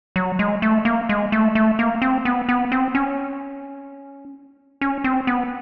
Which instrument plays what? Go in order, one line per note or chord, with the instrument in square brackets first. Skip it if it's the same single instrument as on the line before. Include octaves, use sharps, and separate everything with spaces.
[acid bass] F#3
G#3
A3
A#3
G#3
A3
A3
A#3
C4
B3
B3
C4
C#4
C#4
C4
B3